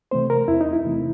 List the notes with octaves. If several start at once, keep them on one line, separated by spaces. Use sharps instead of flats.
C3 E3 A3 C4 C5
A#4
E2 E4
D#4
E4
C3 E3 A3 C4